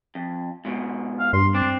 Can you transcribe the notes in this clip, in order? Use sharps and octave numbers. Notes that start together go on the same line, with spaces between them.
F2
G#2 B2
F5
G2 C6
C4 D4